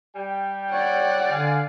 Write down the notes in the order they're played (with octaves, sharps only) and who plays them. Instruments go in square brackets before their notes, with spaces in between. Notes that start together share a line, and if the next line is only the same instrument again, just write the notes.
[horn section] G3 G5
[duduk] C#5 [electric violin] D5 F#5
[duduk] D3 [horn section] F5 G#5